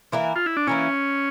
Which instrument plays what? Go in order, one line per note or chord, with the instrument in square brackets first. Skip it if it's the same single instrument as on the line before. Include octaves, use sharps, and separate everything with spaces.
[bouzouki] E3 A#3 E4
[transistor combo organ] F4
E4
D4
[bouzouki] E3 A#3 E4 [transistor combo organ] C#4